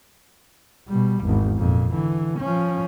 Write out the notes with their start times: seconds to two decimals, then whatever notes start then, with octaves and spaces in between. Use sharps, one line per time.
0.88 B2 G3
1.24 G#1 E2
1.58 F2 A#2
1.93 D3 E3
2.39 F3 C#4